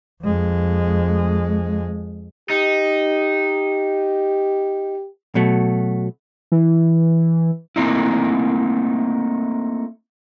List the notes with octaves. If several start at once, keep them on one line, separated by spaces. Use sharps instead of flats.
F2 G#3
D#4 G4
B2 F#3 A3
E3
A3 A#3 C4 D#4 E4